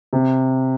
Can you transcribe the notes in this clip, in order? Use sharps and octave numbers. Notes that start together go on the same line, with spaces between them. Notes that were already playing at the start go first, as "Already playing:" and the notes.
C3